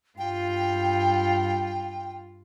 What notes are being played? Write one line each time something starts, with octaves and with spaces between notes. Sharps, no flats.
G2 F4 G5